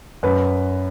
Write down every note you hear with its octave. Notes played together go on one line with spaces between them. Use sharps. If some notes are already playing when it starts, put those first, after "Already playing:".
F#2 B4